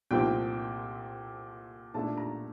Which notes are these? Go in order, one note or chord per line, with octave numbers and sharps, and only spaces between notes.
C2 A#2 F3 A3 C4 G5
A#2 A3 D4 A5
A#5